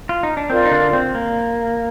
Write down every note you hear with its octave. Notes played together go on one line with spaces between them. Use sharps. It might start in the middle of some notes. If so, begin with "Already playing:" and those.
F4
D#4
D4
C4 F4 A#4 D5 F5
D#4
D3 D4
C4
A#3